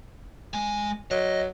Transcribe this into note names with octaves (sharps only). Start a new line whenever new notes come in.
G#3 G#5
F#3 D#5